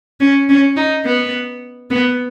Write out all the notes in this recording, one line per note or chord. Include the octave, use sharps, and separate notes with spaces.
C#4
C#4
D#4
B3
B3